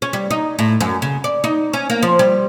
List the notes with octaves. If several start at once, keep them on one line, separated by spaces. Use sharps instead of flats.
C#4
G3
D#4
A2
F#2
C#3
D5
D#4
C#4
A#3
F3
G3